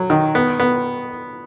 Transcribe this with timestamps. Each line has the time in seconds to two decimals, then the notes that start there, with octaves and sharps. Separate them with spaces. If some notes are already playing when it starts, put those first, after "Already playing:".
Already playing: F#3
0.10 D#3
0.35 B3
0.60 B3